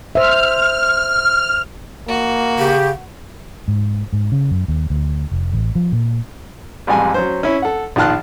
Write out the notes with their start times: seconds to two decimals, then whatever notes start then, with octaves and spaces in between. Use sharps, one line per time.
0.15 C5 E5 F6
2.08 A#3 F#4
2.59 C#3 G4
3.68 G#2
4.13 G#2
4.32 C#3
4.51 F#2
4.68 D#2
4.90 D2
5.31 F1
5.53 A1
5.75 F3
5.92 A#2
6.87 A1 F2 G3 G#3 G#5
7.14 F#3 C#4 C5
7.43 C#4 E4
7.62 A4 F#5
7.96 A#1 D#3 F4 A5 F6 F#6